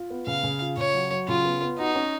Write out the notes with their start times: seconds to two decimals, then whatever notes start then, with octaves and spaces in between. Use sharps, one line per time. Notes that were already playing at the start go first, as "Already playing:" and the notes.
Already playing: F4
0.10 B3
0.26 C#3 F5
0.43 C#3
0.61 F4
0.77 C#3 C#5
0.94 F#3
1.11 F#3
1.27 C#3 F4
1.45 B3
1.62 B3
1.78 D#4 F#4
1.95 C#4